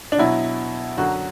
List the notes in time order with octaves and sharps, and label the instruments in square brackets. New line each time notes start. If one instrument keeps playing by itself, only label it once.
[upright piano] D4
B2 F#3 E4
F#2 D3 F#3 F#4